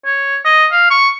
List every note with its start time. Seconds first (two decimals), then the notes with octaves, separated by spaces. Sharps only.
0.05 C#5
0.45 D#5
0.72 F5
0.91 C#6